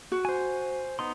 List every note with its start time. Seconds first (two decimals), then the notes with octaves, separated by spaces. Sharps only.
0.12 F#4
0.25 C5 G#5
0.99 B3 D#4 C6